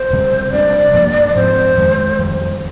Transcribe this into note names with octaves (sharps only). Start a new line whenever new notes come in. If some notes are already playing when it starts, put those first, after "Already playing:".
Already playing: C5
F2 C3 G3
C3 G3 D4 D5
G2 F3 A#3 D4
G#2 F3 C4 C5
F2 D#3 G#3
F2 D#3 G3